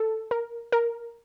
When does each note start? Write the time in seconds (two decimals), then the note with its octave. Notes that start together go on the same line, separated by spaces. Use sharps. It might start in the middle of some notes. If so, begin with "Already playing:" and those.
Already playing: A4
0.31 A#4
0.72 A#4